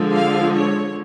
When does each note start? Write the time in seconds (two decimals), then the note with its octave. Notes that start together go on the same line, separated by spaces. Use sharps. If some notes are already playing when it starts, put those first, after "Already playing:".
Already playing: D3 F3 G#3
0.12 F5
0.52 C#5